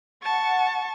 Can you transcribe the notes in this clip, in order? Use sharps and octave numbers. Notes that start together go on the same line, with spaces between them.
F#5 A5 C#6